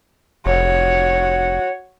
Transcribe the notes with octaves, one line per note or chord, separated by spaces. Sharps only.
F1 F#4 C#5